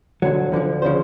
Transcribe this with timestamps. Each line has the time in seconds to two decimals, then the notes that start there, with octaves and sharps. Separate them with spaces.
0.22 D2 D3 F#3
0.52 D2 D3 F3
0.82 C#3 F3 C5